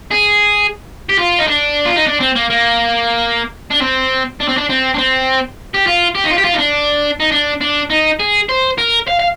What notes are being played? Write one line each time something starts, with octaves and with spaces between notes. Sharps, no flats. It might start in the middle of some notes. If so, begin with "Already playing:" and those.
G#4
G4
F4
D#4
D4
F4
D#4
D4
C4
A#3
A#3
D4
C4
D4
C4
D4
C4
D4
C4
G4
F4
G4
D#4
F4
G4
F4
D#4
D4
D#4
D4
D4
D#4
G#4
C5
A#4
F5
F5